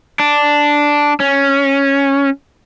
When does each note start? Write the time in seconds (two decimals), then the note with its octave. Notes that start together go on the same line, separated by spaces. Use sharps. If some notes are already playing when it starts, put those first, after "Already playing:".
0.19 D4
1.20 C#4